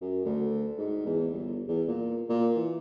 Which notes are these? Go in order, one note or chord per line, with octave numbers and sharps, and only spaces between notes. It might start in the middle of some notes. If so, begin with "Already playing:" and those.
F#2
D2
G#2
E2
G1
E2
A#2
A#2
E3